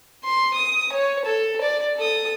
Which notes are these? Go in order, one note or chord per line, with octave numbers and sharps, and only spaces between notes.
C6
D#6
C#5
A4
D5
A4 D#6